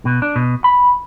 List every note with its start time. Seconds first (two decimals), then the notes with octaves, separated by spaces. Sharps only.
0.05 B2
0.22 D4
0.36 B2
0.64 B5